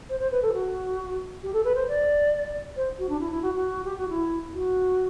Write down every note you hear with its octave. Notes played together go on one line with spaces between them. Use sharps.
C5
C5
B4
A4
F#4
G4
A4
B4
C5
D5
C5
F#4
D4
E4
E4
F#4
F#4
G4
F#4
E4
F#4